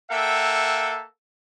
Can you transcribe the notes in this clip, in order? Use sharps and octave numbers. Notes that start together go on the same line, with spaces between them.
A#3 A4 E5 F#5 G5